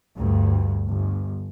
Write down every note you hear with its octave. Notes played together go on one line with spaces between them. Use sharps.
D2 G2
G1